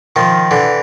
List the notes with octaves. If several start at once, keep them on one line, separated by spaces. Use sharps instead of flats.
D#3 F3
D3 E3